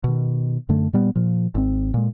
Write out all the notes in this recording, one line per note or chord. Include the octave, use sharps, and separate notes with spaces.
B2 D#3
F#2 D3 A3
A#2 G3 B3
A#2 F3
G#1 C4
A#2 G#3